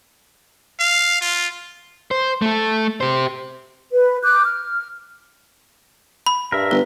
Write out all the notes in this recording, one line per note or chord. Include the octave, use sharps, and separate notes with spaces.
F5
F4
C5
A3 A4
G4 C5
B4
D6 F#6 G6
F6
B5
G2 A#4 E5
G1 B4